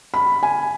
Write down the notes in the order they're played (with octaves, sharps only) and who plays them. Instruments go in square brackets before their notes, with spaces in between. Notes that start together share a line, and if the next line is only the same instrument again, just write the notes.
[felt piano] B5
G#5